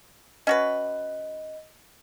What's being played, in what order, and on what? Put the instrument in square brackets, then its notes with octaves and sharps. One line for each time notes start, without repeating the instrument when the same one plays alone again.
[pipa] C#4 F#4 B4 [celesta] D#5